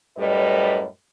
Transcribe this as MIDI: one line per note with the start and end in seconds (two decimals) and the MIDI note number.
0.17 0.85 42
0.17 0.85 45
0.17 0.85 55
0.17 0.85 71
0.17 0.85 73
0.17 0.85 75